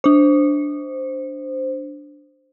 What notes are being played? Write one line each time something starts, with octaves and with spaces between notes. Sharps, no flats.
D4 C5